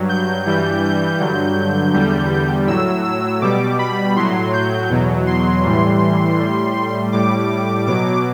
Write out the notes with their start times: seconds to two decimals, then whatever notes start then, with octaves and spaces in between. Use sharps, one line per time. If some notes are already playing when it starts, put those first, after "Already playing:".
Already playing: G2 F#3
0.09 G6
0.45 G2 E3 G3 G6
0.83 G6
1.19 G2 D3 F#3
1.94 E2 D3 G3
2.67 A2 F#3 E6
3.04 E6
3.42 B2 G3 D6
3.79 B5
4.16 A2 F#3 C6
4.53 G6
4.90 E2 B2 F#3
5.27 C6
5.64 A2 E3 G3
6.38 A2 G3
7.12 A2 G3 D6
7.86 B2 F#3 D6